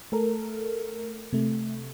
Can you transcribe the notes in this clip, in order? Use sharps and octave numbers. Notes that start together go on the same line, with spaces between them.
A3 A4 A#4
C3 A3